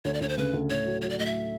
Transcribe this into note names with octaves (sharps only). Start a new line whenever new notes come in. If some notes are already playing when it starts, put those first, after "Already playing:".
D2 C#5
D5
D2 C#5
C5
C#3 B4
D2
A2 C#5
F#3
F#3 C#5
D5
A2 D#5
E5